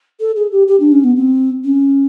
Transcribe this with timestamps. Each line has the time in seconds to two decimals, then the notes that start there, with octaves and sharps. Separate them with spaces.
0.20 A4
0.36 G#4
0.51 G4
0.67 G4
0.80 D4
0.91 C#4
1.03 B3
1.16 C4
1.64 C#4